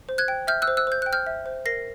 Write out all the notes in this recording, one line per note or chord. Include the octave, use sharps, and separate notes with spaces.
C5
F#6 G#6
G5
E5 F6 G6
E6 F#6
C5
E6 F#6
C5 G6
G5 F#6
F6 G6
E5
C5
A#4 A#6 C7